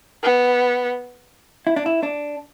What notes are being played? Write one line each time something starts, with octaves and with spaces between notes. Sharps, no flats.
B3
E4
D4
E4
D4